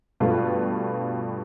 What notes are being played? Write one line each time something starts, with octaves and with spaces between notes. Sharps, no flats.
G2 B2 A3 F4 B4